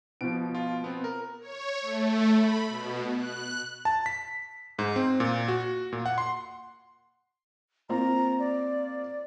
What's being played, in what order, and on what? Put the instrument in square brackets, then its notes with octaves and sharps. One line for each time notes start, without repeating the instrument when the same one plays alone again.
[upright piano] B2 F3 [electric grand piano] D7
[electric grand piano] F4
B3 C4
A#4
[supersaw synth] C#5
A3
B5
B2
F#6
[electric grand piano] A5
B6
G#2
C4
A#2
F#4
A#2
F#5
C6
[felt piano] A#3 C4 F4 [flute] A#5
[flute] D5